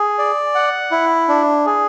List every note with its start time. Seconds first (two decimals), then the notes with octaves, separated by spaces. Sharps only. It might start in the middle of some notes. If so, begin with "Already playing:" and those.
Already playing: G#4
0.19 D5
0.55 F#5
0.91 E4
1.29 D4
1.66 G#4